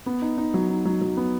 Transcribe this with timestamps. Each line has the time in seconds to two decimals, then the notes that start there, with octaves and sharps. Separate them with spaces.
0.06 B3
0.22 D#4
0.38 D#4
0.54 F#3
0.70 D#4
0.85 F#3
1.01 F#3
1.17 B3